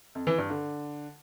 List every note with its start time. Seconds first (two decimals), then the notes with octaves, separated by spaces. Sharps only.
0.15 F2
0.27 E3
0.38 G2
0.50 D3